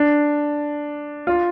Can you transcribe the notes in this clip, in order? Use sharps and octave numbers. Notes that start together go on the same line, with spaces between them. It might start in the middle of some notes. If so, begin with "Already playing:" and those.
Already playing: D4
F4